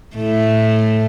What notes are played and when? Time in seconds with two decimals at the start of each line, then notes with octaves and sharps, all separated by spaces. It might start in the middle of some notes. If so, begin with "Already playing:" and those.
0.17 A2 A3